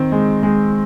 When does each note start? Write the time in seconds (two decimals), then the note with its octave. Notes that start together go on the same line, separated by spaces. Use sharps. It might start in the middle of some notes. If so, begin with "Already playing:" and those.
Already playing: D#3 C4
0.12 G#3
0.43 G#3